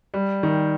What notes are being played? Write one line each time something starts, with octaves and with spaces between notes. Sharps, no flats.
G3
D#3